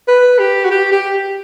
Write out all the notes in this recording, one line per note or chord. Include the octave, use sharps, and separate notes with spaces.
B4
G4
F#4
G4
G4